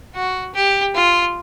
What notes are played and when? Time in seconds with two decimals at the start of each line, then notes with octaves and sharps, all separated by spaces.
0.15 F#4
0.54 G4
0.95 F4